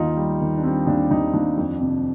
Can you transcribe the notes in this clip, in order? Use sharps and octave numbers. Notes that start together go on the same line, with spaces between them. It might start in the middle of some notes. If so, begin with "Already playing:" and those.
Already playing: D#2 D#3 D#4 F4
G3
D#3
D4
G3 C4
D#2 D4
D#2 D#4
D#2 D4
F2
C3